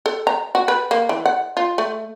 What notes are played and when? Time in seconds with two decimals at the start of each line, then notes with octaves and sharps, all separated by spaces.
0.06 A4
0.27 A#5
0.55 F#4
0.68 B4
0.91 A#3
1.09 E3
1.26 F#5
1.57 F4
1.78 A3